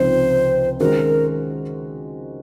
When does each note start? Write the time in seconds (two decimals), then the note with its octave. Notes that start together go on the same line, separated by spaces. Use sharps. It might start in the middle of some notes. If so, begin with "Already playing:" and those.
Already playing: C#2 C3 F3 C4 D#4 C5
0.80 D#3 G#3 C#4 F#4 A#4 C5